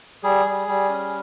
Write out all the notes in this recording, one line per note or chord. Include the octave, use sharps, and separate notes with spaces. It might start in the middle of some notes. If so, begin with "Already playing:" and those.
G3 G#4
G3
G3
C#4